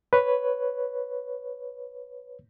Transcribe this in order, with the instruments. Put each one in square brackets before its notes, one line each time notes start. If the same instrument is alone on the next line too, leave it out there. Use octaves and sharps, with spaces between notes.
[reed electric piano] B4 C#5